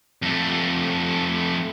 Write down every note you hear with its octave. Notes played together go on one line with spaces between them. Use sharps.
F2 A3